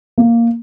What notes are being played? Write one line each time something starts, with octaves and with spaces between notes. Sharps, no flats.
A#3